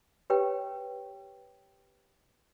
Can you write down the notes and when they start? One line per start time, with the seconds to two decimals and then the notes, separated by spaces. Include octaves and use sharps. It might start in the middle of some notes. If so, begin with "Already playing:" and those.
0.30 G4 B4 C#5 G5